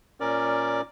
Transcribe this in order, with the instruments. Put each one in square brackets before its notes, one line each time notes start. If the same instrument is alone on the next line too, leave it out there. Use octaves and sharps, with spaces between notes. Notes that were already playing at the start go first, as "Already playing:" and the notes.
[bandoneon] A#2 C#4 A#4 D5 D6